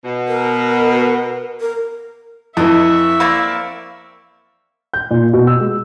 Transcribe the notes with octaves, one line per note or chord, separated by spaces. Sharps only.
B2
A#4
A#4
F2 E3 E4 D#5 E5 C#6
A#3 C4 D5 B5
G6
A#2
B2
E6
G#3